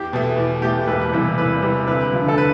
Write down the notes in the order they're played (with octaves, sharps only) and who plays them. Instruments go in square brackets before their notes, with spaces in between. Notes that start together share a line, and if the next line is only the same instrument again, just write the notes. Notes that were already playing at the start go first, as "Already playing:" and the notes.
Already playing: [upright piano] E2 [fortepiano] G4
[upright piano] B2 A3
E2
[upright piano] B2 A3 [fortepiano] G4
[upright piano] E1 [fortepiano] B4
[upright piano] E2 C3 E3 G3 [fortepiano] B4
[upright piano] E1 [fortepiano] B4
[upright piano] E2 C3 E3 G3
[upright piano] D2 [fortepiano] B4
[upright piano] D3 F3
[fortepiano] A4
B4